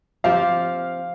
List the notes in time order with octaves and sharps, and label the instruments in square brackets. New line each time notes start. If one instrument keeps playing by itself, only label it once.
[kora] F3 C4 G4 [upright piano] F5